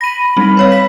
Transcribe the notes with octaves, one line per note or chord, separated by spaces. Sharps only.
B5 A#6 D#7
G3 C4 D#4 B5
B4 C#5 F5
B6